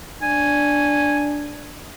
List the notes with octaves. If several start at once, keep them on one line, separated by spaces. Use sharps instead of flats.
D4 G#5